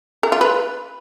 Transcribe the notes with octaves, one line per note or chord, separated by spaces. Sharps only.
A#4
F4
B4